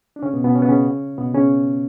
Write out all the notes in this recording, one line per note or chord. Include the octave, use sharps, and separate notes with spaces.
D4
C#3 C#4
B2 B3
B2 B3
C#4
B3
C#3 C#4
B2 B3
C#3 C#4